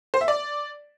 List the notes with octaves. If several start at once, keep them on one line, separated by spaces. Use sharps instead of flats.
C5
E5
D5